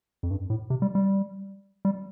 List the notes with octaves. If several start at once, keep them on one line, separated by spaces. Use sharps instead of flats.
F2
G2
A2
C3
G3
G3
G3